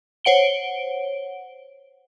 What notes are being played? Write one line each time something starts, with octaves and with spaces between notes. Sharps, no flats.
C5 C#5 F#5 D7 G7